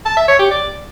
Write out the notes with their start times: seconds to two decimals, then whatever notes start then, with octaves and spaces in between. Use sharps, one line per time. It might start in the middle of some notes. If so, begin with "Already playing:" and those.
0.06 A5
0.17 E5
0.28 C#5
0.39 G4
0.50 D5